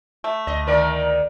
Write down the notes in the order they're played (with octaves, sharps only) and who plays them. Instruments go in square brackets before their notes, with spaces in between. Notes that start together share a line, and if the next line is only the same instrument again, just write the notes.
[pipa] A3
[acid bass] D2 [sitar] D#5
[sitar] D#3 A#4 D5